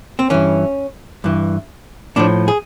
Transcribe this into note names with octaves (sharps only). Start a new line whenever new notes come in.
C4
G2 E3 C#4
G2 E3
A2 F3 D4
G#4